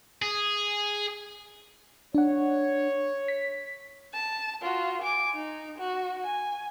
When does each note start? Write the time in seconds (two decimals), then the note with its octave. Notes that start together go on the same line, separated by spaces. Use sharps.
0.22 G#4
2.15 D4 C#5 F#5
3.28 B6
4.14 A5
4.62 F4 F#4
5.02 G#5 D6
5.34 D#4
5.78 F#4
6.24 G#5